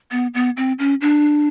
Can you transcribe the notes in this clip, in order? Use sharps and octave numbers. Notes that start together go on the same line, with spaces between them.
B3
B3
C4
C#4
D4